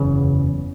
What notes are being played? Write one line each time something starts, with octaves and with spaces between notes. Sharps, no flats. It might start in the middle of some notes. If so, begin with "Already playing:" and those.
Already playing: F#1 E2 C#3 B3